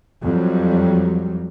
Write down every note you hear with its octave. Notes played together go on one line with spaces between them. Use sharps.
F2 F#3 G3